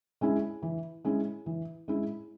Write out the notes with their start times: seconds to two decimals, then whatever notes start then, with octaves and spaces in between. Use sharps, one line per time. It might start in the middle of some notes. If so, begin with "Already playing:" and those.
0.21 G#3 C#4 E4
0.62 E3
1.04 G#3 C#4 E4
1.46 E3
1.88 G#3 C#4 E4